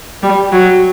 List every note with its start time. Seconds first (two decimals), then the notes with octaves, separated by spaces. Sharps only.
0.23 G3
0.52 F#3